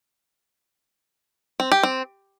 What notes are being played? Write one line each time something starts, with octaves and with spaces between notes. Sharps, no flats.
C4
G4
C4